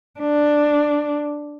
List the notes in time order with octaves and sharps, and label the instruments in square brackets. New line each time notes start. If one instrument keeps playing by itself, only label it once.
[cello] D4